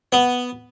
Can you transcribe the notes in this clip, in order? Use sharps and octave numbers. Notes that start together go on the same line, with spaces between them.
B3